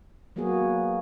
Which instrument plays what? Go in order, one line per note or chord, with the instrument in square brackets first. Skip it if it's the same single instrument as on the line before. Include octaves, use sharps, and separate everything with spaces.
[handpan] F#3 A#3 B3 F#4 G#4